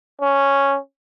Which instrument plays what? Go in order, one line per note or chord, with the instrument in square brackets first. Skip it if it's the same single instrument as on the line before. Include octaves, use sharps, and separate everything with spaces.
[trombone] C#4